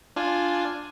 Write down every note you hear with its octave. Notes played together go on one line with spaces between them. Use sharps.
D4 F4 G#5